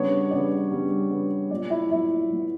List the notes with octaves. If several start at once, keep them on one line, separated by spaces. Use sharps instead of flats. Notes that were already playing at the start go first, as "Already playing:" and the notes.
Already playing: C#3 G3 B3 D4 C#5
C#3 G3 B3 D4 D5
C#3 G3 B3 D4
C#3 G3 B3 D4
A#2 F#3 B3 D5
E4 E5
A#2 F#3 B3 E4 E5
A#2 F#3 B3